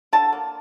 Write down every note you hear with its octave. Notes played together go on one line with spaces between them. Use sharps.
D3 A5
A#3